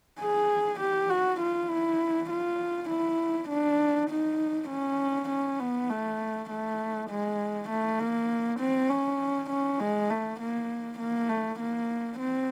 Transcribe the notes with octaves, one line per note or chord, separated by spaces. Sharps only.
G#4
G4
F#4
F4
E4
F4
E4
D4
D#4
C#4
C#4
B3
A3
A3
G#3
A3
A#3
C4
C#4
C#4
G#3
A3
A#3
A#3
A3
A#3
C4